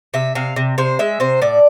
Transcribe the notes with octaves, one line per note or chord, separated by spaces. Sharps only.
C3 E5
C3 F5
C3
C3 C5
G#3 E5
C3 C5
A2 D5